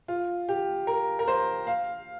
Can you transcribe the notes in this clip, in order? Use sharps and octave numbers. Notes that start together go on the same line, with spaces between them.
F4
G4
A#4
A#4
C5
F5